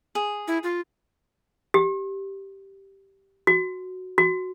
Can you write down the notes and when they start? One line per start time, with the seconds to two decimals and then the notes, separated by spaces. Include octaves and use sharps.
0.15 G#4
0.48 E4
0.63 F4
1.74 G4
3.47 F#4
4.18 F#4